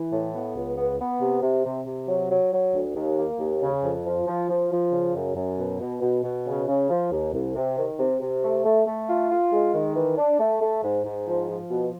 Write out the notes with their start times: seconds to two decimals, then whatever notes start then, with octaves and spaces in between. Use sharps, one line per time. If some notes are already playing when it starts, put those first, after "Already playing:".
Already playing: E3
0.12 A2
0.34 B3
0.56 C#2
0.77 B3
1.00 B3
1.21 C3
1.42 C3
1.65 C3
1.86 C3
2.08 F#3
2.30 F#3
2.53 F#3
2.74 D2
2.96 D#2
3.18 A#3
3.39 D#2
3.62 C#3
3.84 F2
4.05 F3
4.27 F3
4.49 F3
4.71 F3
4.93 C#3
5.15 F#2
5.36 F#2
5.58 B2
5.81 B2
6.02 B2
6.24 B2
6.47 C#3
6.67 C#3
6.90 F3
7.12 D#2
7.33 C2
7.56 C3
7.78 D#3
7.99 C3
8.21 C3
8.43 A3
8.65 A3
8.87 A3
9.09 F4
9.31 F4
9.52 G#3
9.75 D#3
9.96 E3
10.18 D4
10.40 A3
10.61 A3
10.84 G#2
11.05 G#2
11.27 F3
11.49 F3
11.71 B2